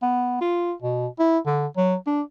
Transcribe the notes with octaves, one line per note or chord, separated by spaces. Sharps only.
B3
F4
B2
E4
D3
F#3
D4